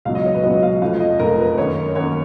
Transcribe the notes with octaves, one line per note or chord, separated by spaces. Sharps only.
C#2 B2 F#3 F5
D#5
C#5
B4
C#2 B2 F#3 D#5
F5
F1 F2 F3 F5
D#5
F1 F2 F3 A#4
B4
F#2 D#3 A#3 C#5
F#2 D#3 A#3 C#5